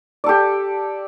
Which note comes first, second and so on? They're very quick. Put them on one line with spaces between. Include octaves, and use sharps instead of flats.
D5 A4 G4